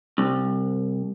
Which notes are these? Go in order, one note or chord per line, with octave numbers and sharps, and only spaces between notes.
C2